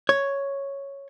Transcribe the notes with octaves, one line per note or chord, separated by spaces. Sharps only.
C#5